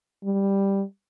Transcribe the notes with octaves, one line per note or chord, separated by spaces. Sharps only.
G3